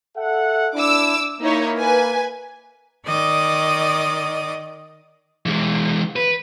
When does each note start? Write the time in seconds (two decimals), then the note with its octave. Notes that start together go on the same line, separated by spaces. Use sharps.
0.17 A4 E5 F#5
0.74 D4 E4 D6 E6
1.41 A#3 D#4 E4 C#5
1.78 B4 G#5
3.06 D#3 D5 D#5 D6 D#6
5.46 E3 G#3
6.16 B4